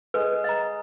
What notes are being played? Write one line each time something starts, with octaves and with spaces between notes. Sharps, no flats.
G#3 B4
D#5 A#5